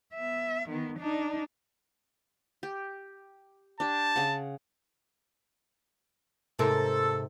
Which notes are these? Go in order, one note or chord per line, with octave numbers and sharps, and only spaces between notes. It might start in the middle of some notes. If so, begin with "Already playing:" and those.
B3 E5
D#3 B3
D4 D#4
G4
D4 G4 A5
C#3 F#5
G#2 C3 A4 A#4